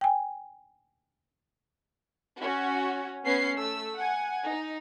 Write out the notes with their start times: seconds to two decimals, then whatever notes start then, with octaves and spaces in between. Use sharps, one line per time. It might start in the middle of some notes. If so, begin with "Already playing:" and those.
0.01 G5 G#5
2.40 C#4 F#4 C#5
3.24 B3 C#4 C7
3.56 A3 E6
3.95 F#5 G#5
4.45 D#4